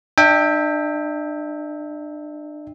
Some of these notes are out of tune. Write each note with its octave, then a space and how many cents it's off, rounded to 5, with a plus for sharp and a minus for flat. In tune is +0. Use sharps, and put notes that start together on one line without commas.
D4 +35 E5 -15 G5 +20